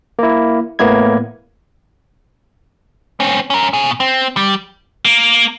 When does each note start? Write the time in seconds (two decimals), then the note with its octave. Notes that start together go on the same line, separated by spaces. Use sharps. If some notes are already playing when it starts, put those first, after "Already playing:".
0.19 A#3 E4
0.79 A2 A#3 B3 E4 G#6
3.20 C4 C#4
3.50 C#4 A#4
3.73 B2 G#5
4.00 C4
4.37 G3
5.05 A#3